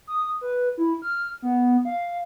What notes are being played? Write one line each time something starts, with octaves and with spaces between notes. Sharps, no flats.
D#6
B4
E4
F6
B3
F5